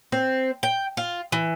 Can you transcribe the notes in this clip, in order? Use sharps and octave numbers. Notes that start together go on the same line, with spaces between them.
C4
G5
F4
E3